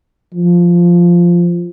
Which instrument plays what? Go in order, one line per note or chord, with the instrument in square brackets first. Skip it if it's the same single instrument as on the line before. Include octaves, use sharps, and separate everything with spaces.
[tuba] F3